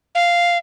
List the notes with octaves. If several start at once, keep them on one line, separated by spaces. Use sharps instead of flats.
F5